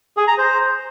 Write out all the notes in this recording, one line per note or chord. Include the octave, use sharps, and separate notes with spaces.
G#4
A#5
C5